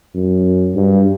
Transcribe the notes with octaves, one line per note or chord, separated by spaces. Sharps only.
F#2
G2